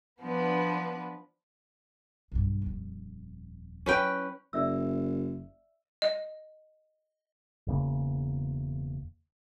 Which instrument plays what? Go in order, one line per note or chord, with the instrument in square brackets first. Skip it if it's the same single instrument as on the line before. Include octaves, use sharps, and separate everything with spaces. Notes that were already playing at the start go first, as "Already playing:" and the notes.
[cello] F3 [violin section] B3 D4 B4
[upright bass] B1 G2
D#1 F2
[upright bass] F#3 E4 [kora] C#4 B4 G5
[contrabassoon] F#1 [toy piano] D5 E5 E6
[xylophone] D#5
[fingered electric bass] E1 E2 C#3 A#3